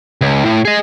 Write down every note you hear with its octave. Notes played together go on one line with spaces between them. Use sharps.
C#2
A2
G#4 D#5